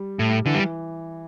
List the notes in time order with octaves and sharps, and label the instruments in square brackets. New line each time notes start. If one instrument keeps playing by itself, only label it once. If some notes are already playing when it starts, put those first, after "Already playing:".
Already playing: [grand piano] G3
[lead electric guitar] A2
[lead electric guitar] D3 [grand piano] E3
[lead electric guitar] G3